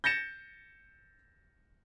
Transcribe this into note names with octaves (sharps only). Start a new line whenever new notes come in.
G6 A6 A#6 C#7 E7